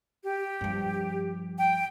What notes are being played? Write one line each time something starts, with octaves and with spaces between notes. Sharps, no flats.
G4
G2 F3
G5